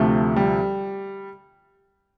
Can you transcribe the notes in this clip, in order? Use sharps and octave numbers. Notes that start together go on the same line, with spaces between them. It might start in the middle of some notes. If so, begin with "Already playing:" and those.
Already playing: D2 C3 F3 A3
G3